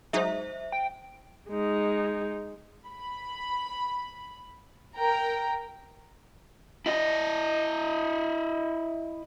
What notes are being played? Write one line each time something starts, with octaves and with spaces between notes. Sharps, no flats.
F#3 G#3 D#4 C5 E5
G5
G#3 D#4
B5
A#4 G5 A#5
E4 D#5